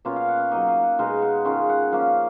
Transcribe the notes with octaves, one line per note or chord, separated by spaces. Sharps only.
B2 A#3 C#4 F4 C#5
F5
F#5
F5
F#3 A#3 D#4 D#5
F5
F#5
B2 G#3 D#4 F5
F#5
D#3 G#3 C#4 F4 F5
F#5
F3 A#3 C#4 F5